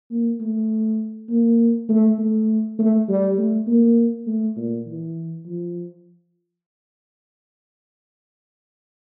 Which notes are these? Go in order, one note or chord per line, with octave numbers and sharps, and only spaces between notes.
A#3
A3
A#3
A3
A3
A3
G3
A3
A#3
A3
A#2
E3
F3